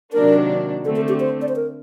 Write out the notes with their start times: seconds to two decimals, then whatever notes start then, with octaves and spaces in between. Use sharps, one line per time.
0.13 C3 D#3 F#3 A#3 D4 A#4
0.85 D3 A3 C4 A4
0.96 A4
1.09 G4
1.20 C5
1.42 D5
1.49 C5
1.56 A#4